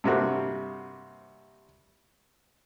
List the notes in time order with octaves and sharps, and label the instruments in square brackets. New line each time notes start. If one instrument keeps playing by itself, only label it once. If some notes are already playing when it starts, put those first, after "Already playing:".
[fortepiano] G2 C3 A#3 F#4